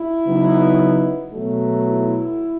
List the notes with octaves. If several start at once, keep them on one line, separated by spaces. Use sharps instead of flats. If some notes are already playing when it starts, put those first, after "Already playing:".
Already playing: E4
C#3 F#3 B3 D#4
B2 F#3 A3
E4